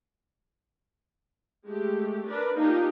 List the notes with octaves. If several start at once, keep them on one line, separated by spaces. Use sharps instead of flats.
G#3 A3 G4
D4 A#4 B4 D5
A#3 D4 D#4 F4 G4